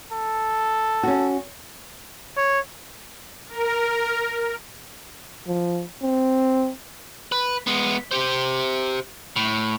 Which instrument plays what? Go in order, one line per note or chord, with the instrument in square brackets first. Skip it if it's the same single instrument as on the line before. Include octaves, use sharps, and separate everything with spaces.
[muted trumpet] A4
[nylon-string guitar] C#4 F#4
[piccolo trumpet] C#5
[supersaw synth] A#4
[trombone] F3
C4
[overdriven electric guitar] B4
G#3 B3
G4 C5
A2